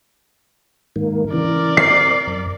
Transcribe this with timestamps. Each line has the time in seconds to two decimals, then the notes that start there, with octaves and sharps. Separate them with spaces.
0.96 G#2 D#3 A#3
1.33 C#3 E3 A#4 D5
1.77 C4 C7
2.27 F#2